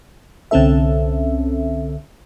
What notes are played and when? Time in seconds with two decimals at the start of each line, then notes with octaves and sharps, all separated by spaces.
0.51 C2 D3 C4 C#4 A4 E5